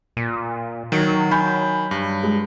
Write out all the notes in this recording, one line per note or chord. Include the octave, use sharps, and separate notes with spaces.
A#2
D#3 F#3
G#5 B5 G6
G2
G#3